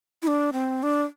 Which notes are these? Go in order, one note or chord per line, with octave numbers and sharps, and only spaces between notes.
E4
D4
C4
D4